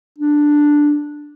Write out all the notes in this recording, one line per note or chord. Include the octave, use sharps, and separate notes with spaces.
D4